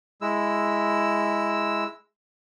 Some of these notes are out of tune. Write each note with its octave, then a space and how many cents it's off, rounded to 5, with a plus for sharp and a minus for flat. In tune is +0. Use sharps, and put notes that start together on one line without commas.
G#3 +0 E4 +0 E6 +0